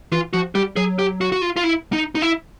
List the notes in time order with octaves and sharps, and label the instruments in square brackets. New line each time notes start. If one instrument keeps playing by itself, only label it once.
[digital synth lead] E3 [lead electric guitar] F4
[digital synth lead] F3 [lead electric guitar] F#4
[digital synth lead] G3 [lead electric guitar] G4
[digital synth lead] F#3 [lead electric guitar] G#4
[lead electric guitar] G4
F#4
F#4
F4
F4
E4
D#4
D#4
E4